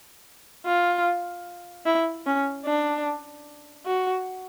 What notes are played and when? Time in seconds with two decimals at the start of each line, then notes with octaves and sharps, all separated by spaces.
0.66 F4
1.86 E4
2.26 C#4
2.66 D4
3.86 F#4